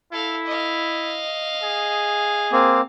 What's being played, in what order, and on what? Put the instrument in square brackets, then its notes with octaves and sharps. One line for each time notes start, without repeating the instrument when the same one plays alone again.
[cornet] E4 [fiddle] A4 F5
[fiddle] D#5 F5
[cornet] G#4
[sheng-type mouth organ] A#3 C4 [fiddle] F5